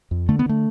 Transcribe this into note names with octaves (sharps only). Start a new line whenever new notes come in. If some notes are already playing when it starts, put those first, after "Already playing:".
F2
D3 A3
B3
D3 A3